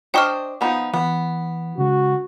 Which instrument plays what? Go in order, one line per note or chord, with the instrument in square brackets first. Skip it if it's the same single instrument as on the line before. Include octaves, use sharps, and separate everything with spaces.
[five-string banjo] D4 C5 D#5 [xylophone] G5 C#6 F6
[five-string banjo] F3 B3 D#4
[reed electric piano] E3 [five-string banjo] B3
[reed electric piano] C#3 G#3 [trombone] F#4